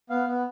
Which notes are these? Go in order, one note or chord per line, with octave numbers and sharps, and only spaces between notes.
B3 F5
B3